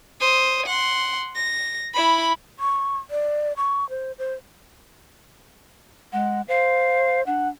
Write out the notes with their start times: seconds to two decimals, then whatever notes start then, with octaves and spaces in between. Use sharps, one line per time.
0.21 C5 D#6
0.66 F#5 C6
1.36 A#6
1.94 E4 B5
2.60 C#6
3.11 D5
3.57 C#6
3.90 C5
4.19 C5
6.13 G#3 F#5
6.48 C5 F5
7.26 D4 F#5